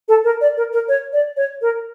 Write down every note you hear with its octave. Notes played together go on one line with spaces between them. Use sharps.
A4
A#4
D5
A#4
A#4
C#5
D5
C#5
A#4